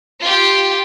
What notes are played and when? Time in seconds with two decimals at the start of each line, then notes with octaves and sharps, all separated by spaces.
0.21 F4 G4